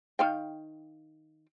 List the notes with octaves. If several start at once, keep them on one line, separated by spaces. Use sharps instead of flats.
D#3 F5 G5